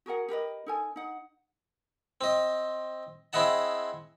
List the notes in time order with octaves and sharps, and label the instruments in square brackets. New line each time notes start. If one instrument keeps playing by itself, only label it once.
[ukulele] F#4 G#4 A#4 F#5
G4 A#4 B4 D#5
D#4 A4 G#5
D#4 F#5
[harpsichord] C4 D#5
C4 E4 G#4 D#5 F#5 A5